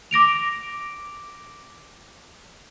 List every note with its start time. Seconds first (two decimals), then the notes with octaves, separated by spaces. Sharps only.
0.11 D6 A#6 D7 F7